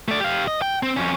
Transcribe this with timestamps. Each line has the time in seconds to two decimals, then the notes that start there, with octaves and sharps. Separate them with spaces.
0.08 A3 D5
0.20 G4 F5
0.48 D#5
0.62 G5
0.83 C4
0.97 F2 C#4